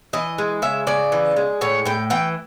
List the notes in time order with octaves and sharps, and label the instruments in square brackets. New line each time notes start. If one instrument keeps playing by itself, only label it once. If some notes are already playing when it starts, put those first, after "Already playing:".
[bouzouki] E3 D#5
G#3
C#3 E5
C#3 D5
E3
G#3
A2 C#5
A2 G5
E3 G5